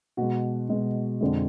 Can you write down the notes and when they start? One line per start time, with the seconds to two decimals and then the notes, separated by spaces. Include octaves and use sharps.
0.17 B2 G#3 F#4
0.69 B2 G#3
1.21 F2 D3 G#3